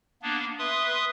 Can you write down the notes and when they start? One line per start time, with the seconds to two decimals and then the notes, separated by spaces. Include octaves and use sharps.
0.22 A#3 B3 D4
0.59 B4 E5 C6 D#6